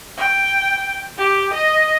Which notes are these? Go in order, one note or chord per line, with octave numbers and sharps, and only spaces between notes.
G5
G4
D#5